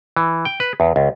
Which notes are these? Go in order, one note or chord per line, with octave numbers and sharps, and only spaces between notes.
E3
G5
B4
E2
C#2